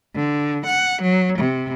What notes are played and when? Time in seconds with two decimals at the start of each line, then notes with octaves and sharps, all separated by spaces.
0.15 D3
0.66 F#5
1.02 F#3
1.38 C3